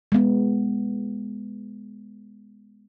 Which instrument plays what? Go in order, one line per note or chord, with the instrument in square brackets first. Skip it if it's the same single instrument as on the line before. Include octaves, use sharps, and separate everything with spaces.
[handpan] G#3 B3